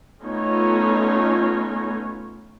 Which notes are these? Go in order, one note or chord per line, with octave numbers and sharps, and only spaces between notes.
A3 B3 C#4 D#4 F4 C#5